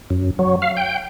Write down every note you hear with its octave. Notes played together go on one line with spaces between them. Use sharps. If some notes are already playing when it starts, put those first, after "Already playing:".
F#2
F#3
F5
G5